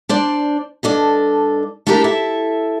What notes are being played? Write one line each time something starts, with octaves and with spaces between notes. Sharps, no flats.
D4 C5 D5
G2 D4 A4 D#5
A3 D4 E4 G4 A4 A#4
E4 A4 E5